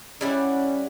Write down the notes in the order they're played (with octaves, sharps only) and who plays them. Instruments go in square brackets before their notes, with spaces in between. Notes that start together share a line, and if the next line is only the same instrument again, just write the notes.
[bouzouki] G3 E4 F#5 [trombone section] C#4